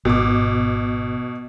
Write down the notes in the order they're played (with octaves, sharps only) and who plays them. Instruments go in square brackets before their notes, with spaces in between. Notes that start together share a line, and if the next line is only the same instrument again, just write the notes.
[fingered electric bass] G#1 [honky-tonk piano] B2 D6